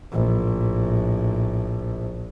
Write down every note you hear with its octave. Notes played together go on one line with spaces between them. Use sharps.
A#1 A2